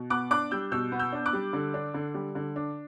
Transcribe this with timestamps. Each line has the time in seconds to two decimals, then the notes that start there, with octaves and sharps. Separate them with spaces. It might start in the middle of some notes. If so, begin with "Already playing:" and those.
Already playing: B2
0.10 B3 D6 F#6
0.31 D4 D6 F#6
0.51 G3 E6 G6
0.72 B2 E6 G6
0.92 B3
0.99 E6 G6
1.13 D4
1.26 D6 F#6
1.33 G3
1.53 D3
1.74 D4
1.94 D3
2.14 G3
2.35 D3
2.56 D4